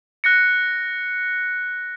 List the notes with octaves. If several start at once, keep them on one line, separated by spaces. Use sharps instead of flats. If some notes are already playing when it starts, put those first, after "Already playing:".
F#6 A#6 C#7